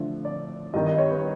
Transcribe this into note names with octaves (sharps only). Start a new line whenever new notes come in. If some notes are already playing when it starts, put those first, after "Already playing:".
Already playing: D3 F3 A3 D4
D5
G2 D#3 G3 D#5
D#5
C#5
B4